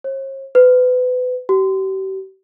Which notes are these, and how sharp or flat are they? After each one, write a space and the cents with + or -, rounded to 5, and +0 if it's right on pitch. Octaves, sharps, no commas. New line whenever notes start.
C#5 -45
B4 +30
G4 -40